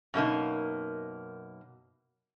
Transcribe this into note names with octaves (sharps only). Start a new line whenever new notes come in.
F#2 B2 A#3 D#4